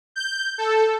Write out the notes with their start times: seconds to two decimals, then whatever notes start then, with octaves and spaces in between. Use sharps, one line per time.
0.16 G6
0.58 A4